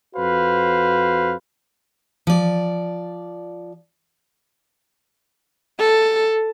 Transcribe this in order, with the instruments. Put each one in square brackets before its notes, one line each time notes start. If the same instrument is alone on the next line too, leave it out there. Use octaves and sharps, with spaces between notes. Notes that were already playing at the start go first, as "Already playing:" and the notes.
[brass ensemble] F2 F#4 B4 C5 F5
[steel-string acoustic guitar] F3 D5
[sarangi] A4